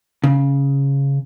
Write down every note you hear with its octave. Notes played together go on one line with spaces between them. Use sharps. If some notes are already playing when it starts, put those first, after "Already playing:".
C#3